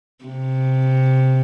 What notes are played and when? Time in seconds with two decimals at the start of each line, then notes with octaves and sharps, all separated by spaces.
0.25 C3